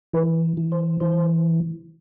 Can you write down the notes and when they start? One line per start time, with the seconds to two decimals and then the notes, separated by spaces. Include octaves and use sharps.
0.13 E3 B4
0.57 E3
0.72 C5
1.00 E3 C5